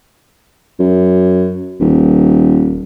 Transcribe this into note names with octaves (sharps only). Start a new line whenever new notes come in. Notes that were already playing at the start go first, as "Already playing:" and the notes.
F#2
D#1